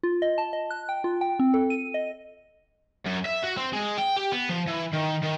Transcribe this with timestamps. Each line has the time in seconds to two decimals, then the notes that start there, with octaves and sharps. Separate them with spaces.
0.03 F4
0.22 D#5
0.38 A5
0.53 D#5
0.70 F#6
0.89 G5
1.04 F4
1.21 G5
1.39 C4
1.54 A4
1.70 D#7
1.94 D#5
3.06 F#2
3.26 E5
3.43 F#4
3.57 C4
3.73 G#3
3.98 G5
4.16 G4
4.32 B3
4.49 F3
4.68 E3
4.93 D#3
5.23 D#3